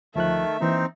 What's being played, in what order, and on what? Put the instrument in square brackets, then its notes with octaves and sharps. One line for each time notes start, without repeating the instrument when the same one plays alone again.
[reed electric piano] D2 F3 F#6 [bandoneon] D#3 A3 [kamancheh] E5
[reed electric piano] E3 A#3 [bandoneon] C4 D#4